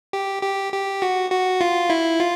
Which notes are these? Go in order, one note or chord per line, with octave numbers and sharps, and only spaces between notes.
G4
G4
G4
F#4
F#4
F4
E4
F4